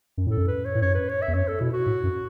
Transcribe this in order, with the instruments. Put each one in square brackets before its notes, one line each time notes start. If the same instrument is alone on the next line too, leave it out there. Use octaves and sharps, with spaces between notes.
[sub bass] F#2
[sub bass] A2 [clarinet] A4
[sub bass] F#2
[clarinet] B4
C#5
[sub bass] A2
[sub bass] F#2 [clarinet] C#5
[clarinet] B4
C#5
E5
[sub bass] E2
[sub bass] F#2 [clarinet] C#5
[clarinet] A4
[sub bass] B2 [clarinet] E4
[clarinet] F#4
[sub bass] A2
F#2